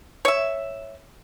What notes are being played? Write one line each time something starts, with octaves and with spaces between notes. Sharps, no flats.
C#5 E5